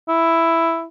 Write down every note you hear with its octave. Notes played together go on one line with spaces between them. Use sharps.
E4